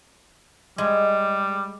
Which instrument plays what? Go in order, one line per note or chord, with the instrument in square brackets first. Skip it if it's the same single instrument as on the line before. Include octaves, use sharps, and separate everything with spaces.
[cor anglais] G3 [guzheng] G#3